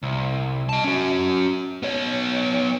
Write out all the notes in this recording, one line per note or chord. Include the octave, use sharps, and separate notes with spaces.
C2
D#5 A5
C#4 F#4
B3 C#5